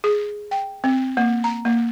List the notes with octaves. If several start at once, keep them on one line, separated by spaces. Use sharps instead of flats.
G#4
G5
C4
A#3
A#5
A#3